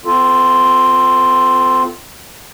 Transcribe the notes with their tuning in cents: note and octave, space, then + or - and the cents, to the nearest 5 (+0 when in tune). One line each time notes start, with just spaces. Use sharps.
C4 -35 F4 +0 A4 +0